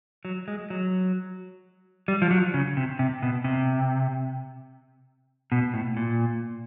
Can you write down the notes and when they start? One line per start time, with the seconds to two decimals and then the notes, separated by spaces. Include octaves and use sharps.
0.25 F#3
0.48 G#3
0.70 F#3
2.08 G3
2.22 F3
2.31 F#3
2.54 C#3
2.77 C3
2.99 C3
3.23 B2
3.44 C3
5.52 B2
5.74 A2
5.97 A#2